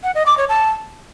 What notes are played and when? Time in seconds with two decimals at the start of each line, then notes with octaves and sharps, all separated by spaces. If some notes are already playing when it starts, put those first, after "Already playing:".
0.03 F#5
0.15 D#5
0.26 D6
0.38 C#5
0.49 A5